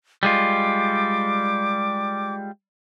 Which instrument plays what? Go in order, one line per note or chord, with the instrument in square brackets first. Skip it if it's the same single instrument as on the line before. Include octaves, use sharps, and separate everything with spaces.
[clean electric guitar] G3 G#3 F4 [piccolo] D6